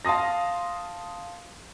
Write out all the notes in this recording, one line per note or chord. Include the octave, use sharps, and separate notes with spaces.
F5 A5 C6 D#6 A#6